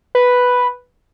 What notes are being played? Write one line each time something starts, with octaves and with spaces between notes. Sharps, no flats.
B4